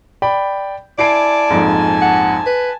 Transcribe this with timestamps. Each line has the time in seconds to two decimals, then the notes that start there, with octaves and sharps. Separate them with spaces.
0.22 D5 G5 B5
0.98 E4 D5 G#5 A5 C7 D7
1.50 A#1 F2 G#2
2.01 F#5
2.46 B4